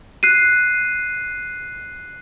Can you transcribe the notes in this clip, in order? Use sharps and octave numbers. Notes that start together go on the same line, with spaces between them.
F#6 C7 D#7